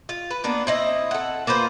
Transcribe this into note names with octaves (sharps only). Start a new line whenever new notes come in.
F4
B4
A#3 B3 D4
C4 E4 D#5
A4 F#5
A#3 F4 B4 C5